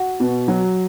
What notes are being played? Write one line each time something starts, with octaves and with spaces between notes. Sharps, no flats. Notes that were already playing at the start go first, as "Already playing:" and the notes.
Already playing: F#4
B2
F#3